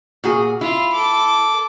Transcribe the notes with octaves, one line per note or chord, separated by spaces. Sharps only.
A#2 F#4 G#4
E4 F4 F5
A4 D6